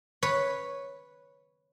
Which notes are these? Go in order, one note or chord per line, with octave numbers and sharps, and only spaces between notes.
B4 C#5